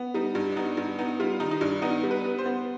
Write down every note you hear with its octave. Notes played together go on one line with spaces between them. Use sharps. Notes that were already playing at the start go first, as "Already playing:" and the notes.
Already playing: B3
G3 D#4
G2
D4
B3 D#4
G2
B3 D#4
G3 F4
D#3 D#4
D#4
G2 D4
B3 D#4
G3
B4
B3
C5
B3